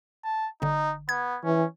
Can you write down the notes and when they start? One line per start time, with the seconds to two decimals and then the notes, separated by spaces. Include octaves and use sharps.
0.24 A5
0.62 G1 D3 D#4
1.09 B3 G#6
1.44 E3 C#4